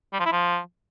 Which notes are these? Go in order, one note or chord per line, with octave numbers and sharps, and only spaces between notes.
G3
F3
E4
F3